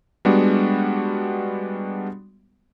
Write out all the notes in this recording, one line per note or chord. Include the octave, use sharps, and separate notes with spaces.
G3 G#3 B3 D4 F#4